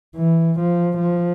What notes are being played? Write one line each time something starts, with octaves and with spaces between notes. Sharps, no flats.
E3
F3
F3